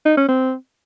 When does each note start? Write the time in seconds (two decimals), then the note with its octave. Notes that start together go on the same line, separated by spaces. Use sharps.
0.06 D#4
0.17 C#4
0.29 C4